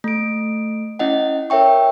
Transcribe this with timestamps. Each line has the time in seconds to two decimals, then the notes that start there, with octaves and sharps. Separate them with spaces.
0.04 A3 D7
0.99 C#4 E4 D#5 F#5
1.50 A#4 C#5 E5 G5 C#6